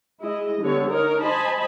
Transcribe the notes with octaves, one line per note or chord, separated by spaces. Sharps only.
G#3 E4 G#4 D#5
D3 G3 B3 C#5
D#4 A#4 C#5
C5 D#5 G#5 A5 B5